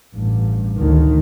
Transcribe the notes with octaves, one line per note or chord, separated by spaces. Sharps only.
A1 G2
D2 D#3